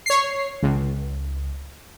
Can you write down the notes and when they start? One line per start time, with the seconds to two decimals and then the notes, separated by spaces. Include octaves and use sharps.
0.06 C#5 C7
0.63 C#2